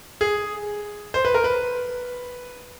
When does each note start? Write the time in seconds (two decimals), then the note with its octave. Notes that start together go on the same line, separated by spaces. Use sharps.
0.21 G#4
1.14 C5
1.25 B4
1.34 A#4
1.44 B4